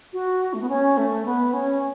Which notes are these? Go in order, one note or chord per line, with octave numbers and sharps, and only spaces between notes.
F#4
A3
B3
C#4
A3
B3
C#4